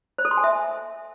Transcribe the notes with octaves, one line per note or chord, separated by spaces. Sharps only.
C5
A4
C6
G#5
E5